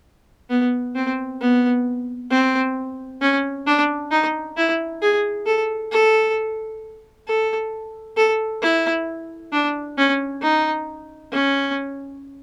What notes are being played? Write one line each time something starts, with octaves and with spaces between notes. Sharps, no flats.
B3
C4
B3
C4
C#4
D4
D#4
E4
G#4
A4
A4
A4
A4
E4
D4
C#4
D#4
C#4